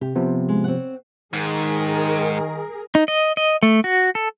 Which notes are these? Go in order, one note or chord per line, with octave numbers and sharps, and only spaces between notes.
C3 G4
C3 F3 B3
G#3
C4 C#5 F#5
G#2 D#3 G#4 A#4
D#4
D#5
D#5
A3
F#4
A4